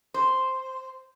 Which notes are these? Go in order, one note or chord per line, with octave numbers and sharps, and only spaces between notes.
C5